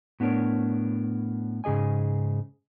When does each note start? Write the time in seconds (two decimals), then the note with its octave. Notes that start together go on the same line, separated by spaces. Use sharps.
0.20 A2 B3 D4 G4 A#4 C#5
1.64 G#2 C#3 G#4 D#5 G#5